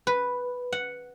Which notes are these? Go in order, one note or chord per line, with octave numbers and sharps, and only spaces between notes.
B4
F#5